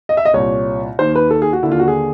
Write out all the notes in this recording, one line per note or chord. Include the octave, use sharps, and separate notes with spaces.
D#5
E5
D#5
C2 A#2 C#5
D#2 D#3 C5
B4
A4
G#4
F#4
D#2 D3 E4
F4
F#4
G#4